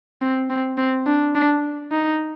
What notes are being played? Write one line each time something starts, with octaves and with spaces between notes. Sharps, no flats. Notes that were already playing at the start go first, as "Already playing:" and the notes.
C4
C4
C4
D4
D4
D#4